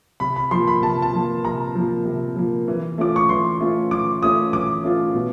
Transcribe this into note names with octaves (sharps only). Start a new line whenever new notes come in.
C3 B5
B5
F3 A#3 C6
B5
C3 A5
A5
F3 A#3
C3 A#5
F3 A#3
C3
F3 A#3
E3
A3 C#4 F4 D6
C#6
E3 C6
A3 C#4 F4
E3 D6
A3 C#4 F4 D#6
E3 D6
A3 C#4 F4
B2